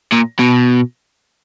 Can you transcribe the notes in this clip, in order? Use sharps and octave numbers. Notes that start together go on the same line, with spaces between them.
A#2
B2